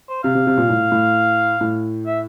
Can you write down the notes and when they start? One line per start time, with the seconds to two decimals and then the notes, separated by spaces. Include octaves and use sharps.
0.09 C5
0.24 C3 F5
0.35 C3
0.47 C3
0.58 A#2
0.69 A2
0.92 A2
1.61 A2
2.06 E5